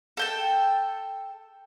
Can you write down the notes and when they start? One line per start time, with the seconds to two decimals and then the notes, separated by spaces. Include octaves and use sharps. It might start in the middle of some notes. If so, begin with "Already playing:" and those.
0.17 A4 G5 A5